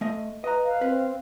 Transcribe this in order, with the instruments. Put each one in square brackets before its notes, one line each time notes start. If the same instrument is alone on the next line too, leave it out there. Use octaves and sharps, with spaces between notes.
[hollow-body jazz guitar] A3 D#5
[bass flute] B4 [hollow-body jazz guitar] D#5 A#5
[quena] F5
[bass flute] C4 [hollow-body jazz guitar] B4